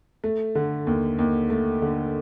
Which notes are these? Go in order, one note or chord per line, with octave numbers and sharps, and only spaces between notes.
A3
D3
D#2
D#2
A3
D3